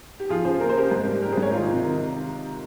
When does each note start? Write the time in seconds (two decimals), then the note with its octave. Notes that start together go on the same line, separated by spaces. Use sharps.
0.20 G4
0.29 F3 F4 G#4
0.45 C#3 G#4 C5
0.60 A#3 A#4
0.69 C5
0.76 C#3 G4 A#4
0.91 G#2
1.07 G3
1.22 A#3 G4 A#4
1.32 G#4 C5
1.37 G#2 A#4 C#5
1.52 D#3 F4
1.67 C3
1.83 D#3